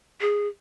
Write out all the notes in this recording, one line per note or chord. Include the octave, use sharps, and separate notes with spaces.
G#4